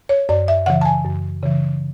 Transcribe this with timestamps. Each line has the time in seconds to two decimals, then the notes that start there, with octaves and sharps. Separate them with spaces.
0.09 C#5
0.29 F#2 D5
0.48 E5
0.66 C#3 E3 F#5
0.81 A5
0.85 G#5
1.04 F#2
1.43 C#3 E3